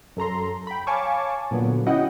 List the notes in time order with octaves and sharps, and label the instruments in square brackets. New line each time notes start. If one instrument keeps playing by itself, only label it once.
[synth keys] F#2 A4 A#5 C6
G5 B5
C#5 F5 G#5 A5 C#6 D6
A#2 D3 F#3 B3
C#4 E4 F#4 D#5 F#5 G5